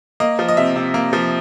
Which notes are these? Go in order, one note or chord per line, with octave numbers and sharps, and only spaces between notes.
A#3 D#5
F3
D#5
C3 E5
C3
A#3
F3